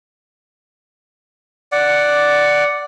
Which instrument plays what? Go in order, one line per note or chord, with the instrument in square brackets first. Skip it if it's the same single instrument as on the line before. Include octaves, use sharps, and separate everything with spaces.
[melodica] D5 F#5